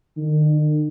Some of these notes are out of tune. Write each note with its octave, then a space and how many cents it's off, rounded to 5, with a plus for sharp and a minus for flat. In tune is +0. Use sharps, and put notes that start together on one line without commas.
D#3 -45